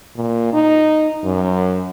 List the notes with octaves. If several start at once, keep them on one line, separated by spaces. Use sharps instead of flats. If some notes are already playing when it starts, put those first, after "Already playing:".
A#2
D#4
F#2